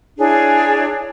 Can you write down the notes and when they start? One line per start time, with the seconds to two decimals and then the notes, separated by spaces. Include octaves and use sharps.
0.19 D4 E4 G#4 C#5